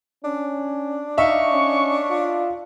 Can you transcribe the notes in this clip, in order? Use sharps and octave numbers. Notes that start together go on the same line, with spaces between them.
C#4 D4
D#4 E5 F5 C#6
C#4
F4